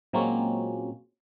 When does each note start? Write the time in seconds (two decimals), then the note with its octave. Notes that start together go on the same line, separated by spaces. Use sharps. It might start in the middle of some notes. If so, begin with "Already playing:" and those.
0.13 A#2 F#3 G#3 A#3 C4 C#4